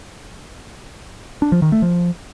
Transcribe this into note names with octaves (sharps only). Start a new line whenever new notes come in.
D4
F3
D#3
A3
F3